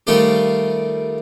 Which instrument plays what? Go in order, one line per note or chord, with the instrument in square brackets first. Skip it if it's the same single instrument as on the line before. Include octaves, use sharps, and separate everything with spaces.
[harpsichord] D#3 G3 A3 C4 F4 G4